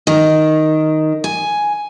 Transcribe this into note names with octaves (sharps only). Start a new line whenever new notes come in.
D#3
G#5